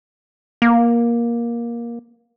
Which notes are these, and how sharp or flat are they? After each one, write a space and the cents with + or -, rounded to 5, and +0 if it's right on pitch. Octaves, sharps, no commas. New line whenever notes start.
A#3 +15